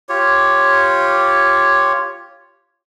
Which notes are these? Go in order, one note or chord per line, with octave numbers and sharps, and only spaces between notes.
F4 G4 C#5